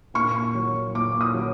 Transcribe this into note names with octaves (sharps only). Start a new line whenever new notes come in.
A#2 C#6
F#3
A#2 D6
D#6
F#3